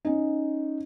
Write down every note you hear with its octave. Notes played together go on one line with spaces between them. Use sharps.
C#4 D#4